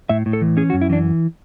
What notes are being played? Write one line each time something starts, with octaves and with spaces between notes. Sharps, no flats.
A2 E5
A2
A4
E3
C#4 G#4
F#4
F#2
E4
E3 D4